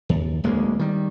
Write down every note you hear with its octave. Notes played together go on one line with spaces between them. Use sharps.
D#2
D1 D2 G#3 A#3
D#3 G3